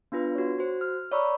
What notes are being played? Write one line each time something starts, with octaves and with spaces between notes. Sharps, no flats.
B3 D4 F4 B4
F#4 C#5
F#4 C5
F6
C#5 D5 A#5 B5 C#6 E6